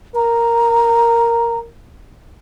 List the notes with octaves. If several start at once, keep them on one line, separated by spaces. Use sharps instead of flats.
A#4 A#5